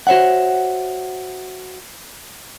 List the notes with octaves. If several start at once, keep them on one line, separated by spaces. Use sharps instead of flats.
F#4 C5 C#5 E5 F#5